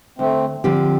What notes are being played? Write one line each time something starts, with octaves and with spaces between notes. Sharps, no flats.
D2 A3 C4
D3 F3 C4 G4